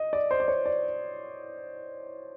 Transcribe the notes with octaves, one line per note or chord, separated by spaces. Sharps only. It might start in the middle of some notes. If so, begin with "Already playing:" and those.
Already playing: D#5
D5
C5
D5
C#5
D5